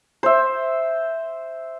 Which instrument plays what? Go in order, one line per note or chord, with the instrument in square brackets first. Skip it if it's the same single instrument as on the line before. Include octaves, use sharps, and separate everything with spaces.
[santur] C5 E5